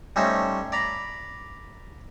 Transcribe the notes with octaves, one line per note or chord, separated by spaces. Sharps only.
G3 A3 C#4 D#4 C5
D5 A#5 B5